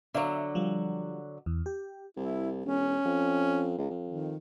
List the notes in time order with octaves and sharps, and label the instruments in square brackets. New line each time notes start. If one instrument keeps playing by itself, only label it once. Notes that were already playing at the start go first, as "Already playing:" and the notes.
[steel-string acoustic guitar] D3 F#3 [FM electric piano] E5 F5
[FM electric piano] F3 G3
E2
G4
[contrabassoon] C2 [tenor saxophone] E4
[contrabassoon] E1 [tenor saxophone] C#4
[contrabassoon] F2
C#2
F2
[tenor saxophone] D#3